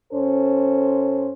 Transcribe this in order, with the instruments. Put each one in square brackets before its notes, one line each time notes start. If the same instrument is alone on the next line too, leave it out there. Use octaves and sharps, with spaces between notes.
[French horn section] F#2 C#4 A4 C5